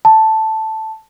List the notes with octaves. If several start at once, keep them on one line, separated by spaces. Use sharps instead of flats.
A5